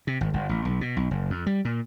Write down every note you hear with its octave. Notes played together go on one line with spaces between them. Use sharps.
C3
G#1
G1
A1
B1
B2
B1
F#1
F2
G3
A#2